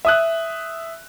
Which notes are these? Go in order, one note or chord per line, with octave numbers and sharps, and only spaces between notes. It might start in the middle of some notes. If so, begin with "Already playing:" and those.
E5 D#6 F#6